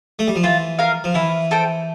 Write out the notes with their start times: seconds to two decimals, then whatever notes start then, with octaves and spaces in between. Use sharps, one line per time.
0.19 A3
0.27 G3
0.35 F3
0.43 E3 F4
0.79 A#4 F5
1.04 F3
1.14 E3 E4
1.51 A4 C5 G5